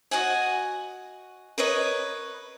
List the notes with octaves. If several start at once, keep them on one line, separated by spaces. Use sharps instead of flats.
F#4 D#5 F#5 G#5
A#4 B4 C#5 D#5